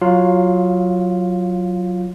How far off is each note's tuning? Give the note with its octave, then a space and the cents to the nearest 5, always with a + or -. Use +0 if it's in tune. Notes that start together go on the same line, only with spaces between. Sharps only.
F#3 -10 F4 -5 F5 +20